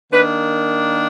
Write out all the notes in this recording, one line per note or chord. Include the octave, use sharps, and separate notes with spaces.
D#3 A#3 D4 B4